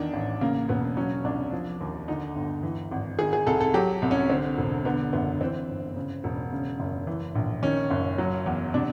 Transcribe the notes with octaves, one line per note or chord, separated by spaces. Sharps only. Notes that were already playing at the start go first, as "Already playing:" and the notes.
Already playing: E2 D#3 D4
A1
C#3 A#3
E1 B3
F#3 C#4
C2 D4
F3
D#2
D3 D#4
G1
E3
G#1
D#3 G#4
G#4
C2 A4
A4
F#3 G4
C2
C#4
D3 C4
E1
D3 B3
F#1 B3
E3 C4
G1
C#3
E1
C#3
F#1
E3
A#1
D#3 C#4
F#1
F#3
E2
C3 D4